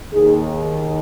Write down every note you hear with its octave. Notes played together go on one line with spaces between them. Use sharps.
D#2 D#3 G#4